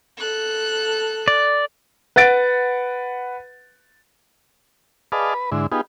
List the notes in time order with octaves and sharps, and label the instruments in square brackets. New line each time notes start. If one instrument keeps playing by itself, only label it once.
[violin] A4 F#6
[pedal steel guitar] D5
[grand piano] B4 F#5 A6 D7
[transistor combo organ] G#4 B4 D5 D#5 F5 A5
B4
G#2 D3 E4
B3 D#4 F4 G4 G#4